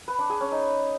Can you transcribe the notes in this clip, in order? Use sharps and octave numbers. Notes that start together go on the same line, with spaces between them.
B4
D4
G#4
C#4
D#4